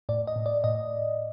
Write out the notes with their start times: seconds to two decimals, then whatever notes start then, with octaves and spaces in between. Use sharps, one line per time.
0.09 A2 D5
0.27 D#5
0.36 A2
0.46 D5
0.64 A2 D#5